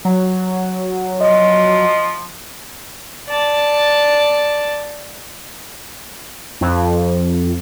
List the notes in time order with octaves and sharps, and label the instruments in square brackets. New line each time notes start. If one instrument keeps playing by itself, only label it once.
[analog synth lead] F#3
[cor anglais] F3 [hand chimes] D#5
[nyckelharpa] D5 A5
[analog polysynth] F2